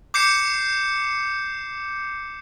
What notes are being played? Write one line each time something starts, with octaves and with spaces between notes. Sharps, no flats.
D6 G6 C7 C#7 E7